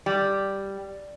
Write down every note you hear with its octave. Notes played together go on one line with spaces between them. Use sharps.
G3